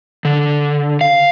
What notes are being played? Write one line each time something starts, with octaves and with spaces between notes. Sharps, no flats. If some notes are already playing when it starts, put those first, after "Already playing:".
D3
F5